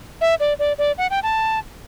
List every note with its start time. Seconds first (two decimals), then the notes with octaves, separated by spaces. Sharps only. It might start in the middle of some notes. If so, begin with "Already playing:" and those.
0.21 E5
0.40 D5
0.59 D5
0.78 D5
0.98 F#5
1.11 G5
1.23 A5